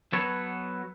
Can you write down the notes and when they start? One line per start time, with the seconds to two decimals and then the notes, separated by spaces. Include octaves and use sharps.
0.13 F#3 B3 F#4 A4 B4 C#5